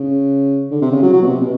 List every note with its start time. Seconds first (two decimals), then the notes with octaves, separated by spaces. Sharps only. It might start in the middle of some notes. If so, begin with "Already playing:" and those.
Already playing: C#3
0.71 D3
0.82 C3
0.92 C#3
1.03 F#3
1.13 F#3
1.22 B2
1.27 C3
1.41 B2